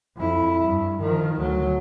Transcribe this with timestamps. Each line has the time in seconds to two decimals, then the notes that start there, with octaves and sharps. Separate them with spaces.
0.16 F2 E4
0.66 G2
1.01 D#3 F3
1.38 D2 F#3